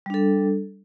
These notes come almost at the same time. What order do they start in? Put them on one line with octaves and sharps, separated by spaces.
G3 D4 A4